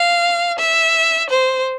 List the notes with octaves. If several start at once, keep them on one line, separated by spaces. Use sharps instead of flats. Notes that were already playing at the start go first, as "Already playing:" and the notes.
Already playing: F5
E5
C5